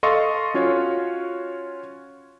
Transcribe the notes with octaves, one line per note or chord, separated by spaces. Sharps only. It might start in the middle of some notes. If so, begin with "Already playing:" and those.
A4 D#5 F5 C6 C#6
C#4 F4 F#4 C#5